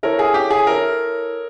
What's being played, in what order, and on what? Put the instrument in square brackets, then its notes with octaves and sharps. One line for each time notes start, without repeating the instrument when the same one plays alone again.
[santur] E4 A4 C#5 [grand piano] A#4
[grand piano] G#4
G4
G#4
[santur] E4 A4 C#5 [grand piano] A#4